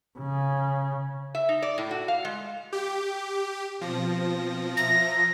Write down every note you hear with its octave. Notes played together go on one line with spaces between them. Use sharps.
C#3
E5
D#4
D5
A2
F#4
F5
G#3
G4
B2 F3 C4 A#6
E5 A#5 A#6